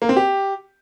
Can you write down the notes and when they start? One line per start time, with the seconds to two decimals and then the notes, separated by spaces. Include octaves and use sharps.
0.02 A#3
0.09 C4
0.17 G4